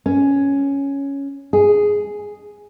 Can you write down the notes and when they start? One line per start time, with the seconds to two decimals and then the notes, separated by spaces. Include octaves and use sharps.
0.06 C#4
1.53 G#4